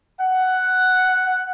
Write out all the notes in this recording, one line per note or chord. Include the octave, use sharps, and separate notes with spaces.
F#5